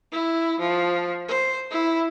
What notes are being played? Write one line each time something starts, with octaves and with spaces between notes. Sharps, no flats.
E4
F3
C5
E4